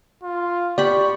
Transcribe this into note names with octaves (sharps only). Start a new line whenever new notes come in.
F4
G4 D5 B5 C#6